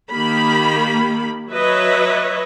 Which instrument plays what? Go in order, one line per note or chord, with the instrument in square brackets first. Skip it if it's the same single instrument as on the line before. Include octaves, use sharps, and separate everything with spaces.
[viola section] D#3 A#3 G4 B5
F#3 B4 C#5 D#5 E5